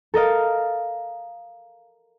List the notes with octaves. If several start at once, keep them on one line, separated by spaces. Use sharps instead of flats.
A4 A#4 D#5 F5